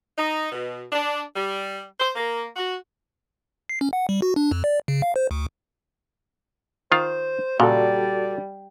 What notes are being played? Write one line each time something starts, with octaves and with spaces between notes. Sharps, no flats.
D#4
B2
D4
G3
C5
A#3
F#4
C7
C#4
F#5
G3
F#4
D4
F2
D5
C#3
F5
C5
D2
D#3 F4 C5
A#2 C#3 G3 F#4 A4 D5